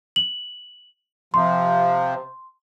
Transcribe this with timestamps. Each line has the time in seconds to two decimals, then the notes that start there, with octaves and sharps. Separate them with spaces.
0.16 F#7
1.34 C3 F3 C6